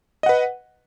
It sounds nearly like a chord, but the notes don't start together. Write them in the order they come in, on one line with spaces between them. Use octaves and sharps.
D#5 F#5 B4